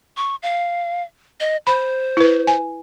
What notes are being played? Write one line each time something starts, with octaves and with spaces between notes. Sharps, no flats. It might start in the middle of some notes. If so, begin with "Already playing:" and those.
C#6
F5
D#5
C5 B5
E4 B4
G#5